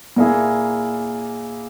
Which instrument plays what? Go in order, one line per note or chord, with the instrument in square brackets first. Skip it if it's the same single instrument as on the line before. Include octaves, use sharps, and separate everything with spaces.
[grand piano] A#2 A#3 E4 G#4